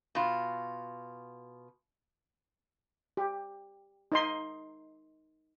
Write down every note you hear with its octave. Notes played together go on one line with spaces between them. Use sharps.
B2 F4
G4
D#4 D#5 C6